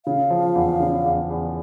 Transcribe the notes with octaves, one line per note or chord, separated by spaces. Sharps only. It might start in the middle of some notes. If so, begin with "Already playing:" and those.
C#3 F5
F3
E2
C#3
E2
E2